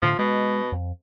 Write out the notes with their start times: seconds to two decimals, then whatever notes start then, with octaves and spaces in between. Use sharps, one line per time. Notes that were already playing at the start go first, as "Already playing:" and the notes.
0.02 A2 D3 F3
0.19 B2 G#3
0.72 F2